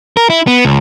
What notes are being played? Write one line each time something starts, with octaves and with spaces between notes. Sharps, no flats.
A#4
E4
B3
C#2